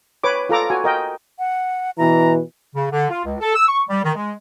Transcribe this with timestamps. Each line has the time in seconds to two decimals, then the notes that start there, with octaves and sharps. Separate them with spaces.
0.24 B4 C#5 D6
0.49 F4 A4 A#5 D6
0.70 F#4 G#5
0.84 A#4 D#5 G5
1.39 F#5
1.98 B2 E3 A#5
2.75 C#3
2.91 D3
3.10 F4
3.25 C#2
3.41 A4
3.55 E6
3.68 C#6
3.89 G3
4.04 D#3
4.16 G#3